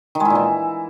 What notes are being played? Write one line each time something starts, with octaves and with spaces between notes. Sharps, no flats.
D#3
G#3
E4
A#2
E3